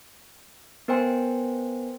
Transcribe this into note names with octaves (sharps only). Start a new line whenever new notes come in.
B3 A#4 C5 G5 G#5 C6